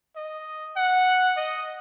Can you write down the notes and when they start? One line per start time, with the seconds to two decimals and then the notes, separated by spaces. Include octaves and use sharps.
0.16 D#5
0.76 F#5
1.37 D#5